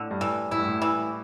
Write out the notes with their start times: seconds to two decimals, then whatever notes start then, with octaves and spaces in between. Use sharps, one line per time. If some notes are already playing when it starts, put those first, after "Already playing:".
Already playing: A2 D3
0.11 G2
0.21 A2 E3
0.51 A2 E4
0.59 G2
0.68 A2
0.82 E3